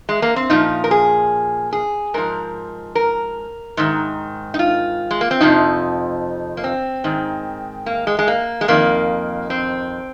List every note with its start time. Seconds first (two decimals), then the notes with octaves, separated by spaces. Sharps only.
0.09 G#3
0.22 A#3
0.36 C4
0.50 A#2 F3 D#4
0.84 A#4
0.91 G#4
1.73 G#4
2.14 G#2 F3 A#4
2.95 A#4
3.77 G#2 D#3
4.54 D#4
4.59 F4
5.11 G#3
5.21 A#3
5.31 C4
5.41 F2 C3 F3 D#4
6.57 A#3
6.64 C4
7.04 G#2 D#3
7.86 A#3
8.07 G#3
8.19 G#3
8.28 A#3
8.61 G#3
8.68 F2 D#3 A#3
9.50 C4